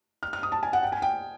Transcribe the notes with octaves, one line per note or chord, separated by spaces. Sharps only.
F6
F6
D#6
A5
G#5
F#5
G5
G#5
G5